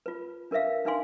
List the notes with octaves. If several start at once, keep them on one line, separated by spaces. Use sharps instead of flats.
F4 B4
D4 A#4 B4 E5 F5
D4 D#4 B4 F5 G#5 C6